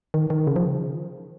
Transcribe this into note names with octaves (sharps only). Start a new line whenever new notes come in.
D#3
D#3
C#3
F3